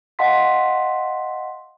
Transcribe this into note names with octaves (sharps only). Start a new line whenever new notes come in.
D#5 F5 F#5 A5 C6 B6